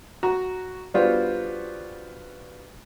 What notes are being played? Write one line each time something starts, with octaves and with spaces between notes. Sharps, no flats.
F#4 A#5
G3 B3 D4 F4 F#4 C5